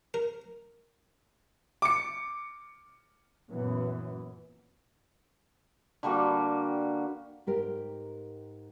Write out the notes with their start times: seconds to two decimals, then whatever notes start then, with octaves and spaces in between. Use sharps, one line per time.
0.14 A#4
1.82 D6 C#7
3.50 F#2 A#2 E3 B3
6.03 D3 G3 A#3 F#4
7.47 G#2 G4 A#4